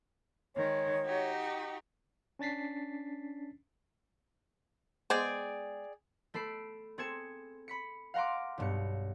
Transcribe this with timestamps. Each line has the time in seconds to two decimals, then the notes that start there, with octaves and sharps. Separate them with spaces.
0.56 D#3 G#3 C#5
1.06 D#4 F#4 G4
2.39 C#4 D4 A6 B6 C7
5.10 G#3 B3 G#4 C5 D5 G5
6.34 A3 A4 B5 C7 D7
6.98 C4 G#4 A4 G#6 C#7 E7
7.68 B5 B6 C#7
8.14 F5 F#5 A#5 C6 D6
8.58 B1 G2 C#7